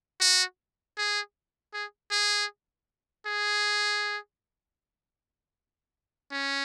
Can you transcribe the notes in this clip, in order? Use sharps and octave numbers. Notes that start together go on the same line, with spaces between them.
F#4
G#4
G#4
G#4
G#4
C#4